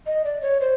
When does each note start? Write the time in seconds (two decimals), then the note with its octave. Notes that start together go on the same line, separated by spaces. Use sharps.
0.06 D#5
0.25 D5
0.42 C#5
0.61 C5